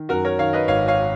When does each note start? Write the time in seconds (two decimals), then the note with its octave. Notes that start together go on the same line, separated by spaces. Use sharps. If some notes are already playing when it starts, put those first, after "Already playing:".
Already playing: D#3
0.09 F#2 F#4 A#4
0.25 A#4 C#5
0.39 D#3 C#5 F5
0.53 B4 D#5
0.68 G#1 C#5 F5
0.88 C#5 F5